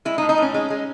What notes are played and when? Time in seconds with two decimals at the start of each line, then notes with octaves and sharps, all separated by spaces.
0.05 G#3 E4
0.18 D#4
0.22 A2
0.29 D#4
0.38 A2 C#4
0.54 G#3
0.70 G#3